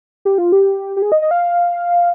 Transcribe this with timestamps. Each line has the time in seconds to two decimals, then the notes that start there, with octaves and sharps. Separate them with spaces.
0.25 G4
0.38 F4
0.52 G4
0.96 G4
1.02 G#4
1.12 D#5
1.22 D#5
1.31 F5